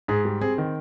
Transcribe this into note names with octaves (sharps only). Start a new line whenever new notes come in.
G#2 G#4
G3
C4 G#4
D#3